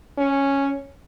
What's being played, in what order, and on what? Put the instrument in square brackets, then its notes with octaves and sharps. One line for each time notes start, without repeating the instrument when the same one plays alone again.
[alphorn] C#4